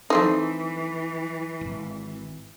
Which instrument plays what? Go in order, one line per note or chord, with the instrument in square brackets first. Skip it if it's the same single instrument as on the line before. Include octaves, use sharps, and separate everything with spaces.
[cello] E3 [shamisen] A3 C4 D#4
[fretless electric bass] D#1 G#1